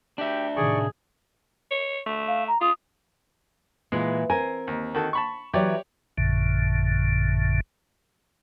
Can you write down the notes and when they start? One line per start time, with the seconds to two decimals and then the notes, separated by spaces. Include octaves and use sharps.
0.18 D4 G4 E5 G5
0.56 A2 C3 D#3 G#4 D5 C#6
1.71 C#5
2.06 A3
2.28 F5
2.48 A#5
2.61 F4 D#6
3.92 A#2 E3 G#3 E4
4.30 C4 A#4 G#5
4.67 D#2
4.95 D#3 F#4 A4
5.13 A5 B5 C#6
5.53 E3 F#3 G4 C#5 D5
6.18 A1 F#2 A#2 D3